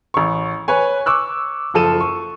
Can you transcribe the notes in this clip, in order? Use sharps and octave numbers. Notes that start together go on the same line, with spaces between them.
A1 C#6
B4 C#5 G#5
C#6 D6 E6 F#6
F#1 F3 A4 D#7 E7
C#6